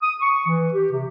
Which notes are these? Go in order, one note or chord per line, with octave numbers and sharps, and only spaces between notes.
D#6
C#6
E3
G4
C3